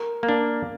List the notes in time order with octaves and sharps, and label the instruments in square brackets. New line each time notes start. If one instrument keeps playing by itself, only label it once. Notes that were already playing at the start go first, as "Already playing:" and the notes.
Already playing: [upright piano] A#4
[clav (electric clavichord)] A#3
D4